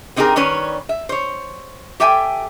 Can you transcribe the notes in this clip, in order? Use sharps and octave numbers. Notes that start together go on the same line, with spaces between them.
B3 C4 D#4 G4 G#4 A#4
D#3 G3 C#4 B4 C#5
E5
C5 C#5
G4 A4 E5 G5 G#5